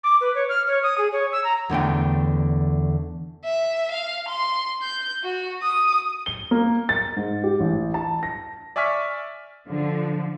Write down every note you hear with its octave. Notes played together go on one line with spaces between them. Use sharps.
D6
B4
C#5
F6
C#5
D#6
G#4
C#5
E6
A#5
E2 D3 A3 G5
E5
F5
C6
G6
F#4
D#6
G7
A#3
A6
G#2
G4
A1
A5
A#6
D5 E5 G#5 C#6 F6 B6
D3 F3